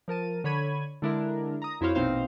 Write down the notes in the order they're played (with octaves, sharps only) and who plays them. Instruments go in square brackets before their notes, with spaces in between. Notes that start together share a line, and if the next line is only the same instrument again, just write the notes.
[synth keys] F3 A#4 A5 D#7
D3 C#5 B5 G#6 D#7
D3 G#3 D4 E4 A#4
A#5 D#6
F2 E4 F#4 C5 C#5 F5
A#1 B2 C4 D#4 C5 F5